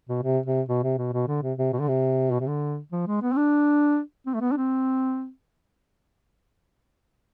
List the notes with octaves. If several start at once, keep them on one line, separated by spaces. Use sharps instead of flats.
B2
C3
C3
B2
C3
B2
B2
D3
C3
C3
B2
D3
C3
B2
C3
D3
F3
G#3
B3
C4
D4
C4
A3
B3
D4
C4